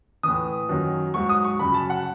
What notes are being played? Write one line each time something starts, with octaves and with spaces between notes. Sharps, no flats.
A2 E3 D#6
F#2 D#3 F#3
G#2 F#3 C#6
D#6
C#6
F#2 C#3 F#3 B5
A5
F#5